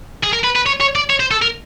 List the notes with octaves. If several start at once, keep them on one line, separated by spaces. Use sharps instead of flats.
G#4
A#4
B4
B4
C#5
C#5
D5
C#5
C5
A4
A#4